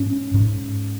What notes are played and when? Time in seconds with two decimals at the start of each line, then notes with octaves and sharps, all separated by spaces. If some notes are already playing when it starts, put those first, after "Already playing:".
Already playing: G#2 C#4
0.34 G#2